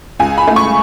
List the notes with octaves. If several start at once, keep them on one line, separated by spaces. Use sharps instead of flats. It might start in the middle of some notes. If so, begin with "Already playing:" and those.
C#2 G#5
B5
A3
C#6